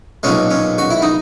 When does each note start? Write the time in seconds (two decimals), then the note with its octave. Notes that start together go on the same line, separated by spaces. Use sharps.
0.23 B1 A#2 G#3 C#4
0.50 C#4
0.78 F#4
0.91 E4
1.02 D#4